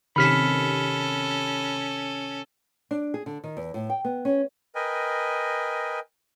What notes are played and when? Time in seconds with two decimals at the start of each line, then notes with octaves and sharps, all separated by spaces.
0.16 C3 D#3 C#4 A4 B5 F6 B6
2.91 D4
3.14 G#4
3.26 D3
3.44 D#3
3.57 E2
3.74 A2
3.90 G5
4.05 B3
4.25 C#4
4.75 A#4 B4 D#5 G5 G#5